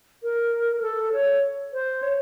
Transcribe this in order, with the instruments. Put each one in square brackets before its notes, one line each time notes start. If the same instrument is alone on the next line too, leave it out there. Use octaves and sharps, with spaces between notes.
[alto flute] A#4
A#4
A4
C#5
C5
C#5